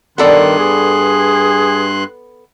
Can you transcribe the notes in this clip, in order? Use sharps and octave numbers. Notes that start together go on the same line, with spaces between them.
G2 D#3 B3 A4 D5 C6 F#6
G#4